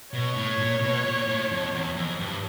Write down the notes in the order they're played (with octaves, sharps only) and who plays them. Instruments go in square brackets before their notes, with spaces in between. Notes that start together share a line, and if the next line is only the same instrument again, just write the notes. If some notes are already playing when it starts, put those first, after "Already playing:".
[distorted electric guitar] B2 [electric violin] C#5
[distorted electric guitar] A2
A#2
B2
A#2
A2
F2
E2
F2
G2